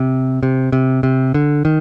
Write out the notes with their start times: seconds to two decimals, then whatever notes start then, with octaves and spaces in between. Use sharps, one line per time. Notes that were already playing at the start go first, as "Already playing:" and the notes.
Already playing: C3
0.43 C3
0.72 C3
1.03 C3
1.34 D3
1.65 D#3